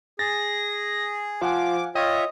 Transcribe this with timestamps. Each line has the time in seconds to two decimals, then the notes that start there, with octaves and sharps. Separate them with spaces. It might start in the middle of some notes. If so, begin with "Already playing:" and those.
0.19 G#4 A6 A#6
1.41 F3 F5 F#5 G#5 D6
1.95 F4 C#5 D#5 E5 G5